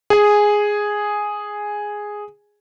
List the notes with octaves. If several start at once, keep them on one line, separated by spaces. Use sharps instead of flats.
G#4 G#5